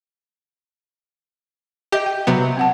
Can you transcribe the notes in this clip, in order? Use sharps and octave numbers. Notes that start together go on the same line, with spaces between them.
G4 D#5 E5 G5
G5
C3 F#3 B3
C4 F#5 A5